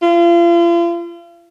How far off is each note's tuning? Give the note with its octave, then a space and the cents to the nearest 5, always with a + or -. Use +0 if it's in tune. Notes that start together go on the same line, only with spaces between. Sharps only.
F4 -40